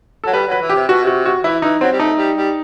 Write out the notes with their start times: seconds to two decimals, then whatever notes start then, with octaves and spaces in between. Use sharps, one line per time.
0.24 F#3 A4
0.33 G3 B4
0.47 F#3 B4
0.61 E3
0.70 G4
0.75 C3
0.88 B2 F#4
1.02 C3 F#4
1.26 F#4
1.44 E3 E4
1.62 E3 D#4
1.81 F#3 C4
1.92 G3
1.99 A3 D#4
2.18 G3
2.36 G3